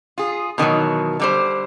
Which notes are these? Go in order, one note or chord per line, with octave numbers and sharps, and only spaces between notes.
F4 G#4
B2 D#3 E3 F#3
D3 G3 C5